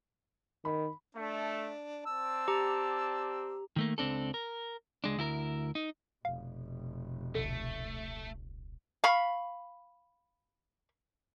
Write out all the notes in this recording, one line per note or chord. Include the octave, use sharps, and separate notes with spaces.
D#3 B5
A3 D4
C4 D5 A5 E6
G4 A#5
D#3 A3 A#3
C#2 F#2 C4 D4 A4
A#4
C#2 G#3 D4
D2 E4 G4 A#4
D#4
F1 B2 F5
D#1 C2 D3 A3
F5 B5 C#6